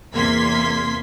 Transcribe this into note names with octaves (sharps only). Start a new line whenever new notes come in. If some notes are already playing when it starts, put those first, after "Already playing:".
E2 C3 A#3 C6 G#6 B6